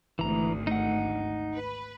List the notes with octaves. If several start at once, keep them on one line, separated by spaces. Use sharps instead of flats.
G#1 D2 E3 A#5
D#4 F#5
B4